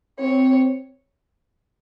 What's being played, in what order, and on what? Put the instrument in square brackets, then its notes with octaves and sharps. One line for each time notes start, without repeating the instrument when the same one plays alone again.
[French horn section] C4 [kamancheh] C#5